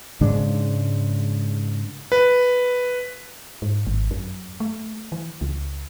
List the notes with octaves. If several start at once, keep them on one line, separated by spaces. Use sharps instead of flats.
G#2 C#3 G#3 D4
B4
G#2
G#1
F#2
A3
E3
C#2